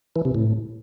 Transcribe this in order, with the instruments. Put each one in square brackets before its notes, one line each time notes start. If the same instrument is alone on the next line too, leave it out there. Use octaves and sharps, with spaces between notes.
[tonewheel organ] E3
C3
A2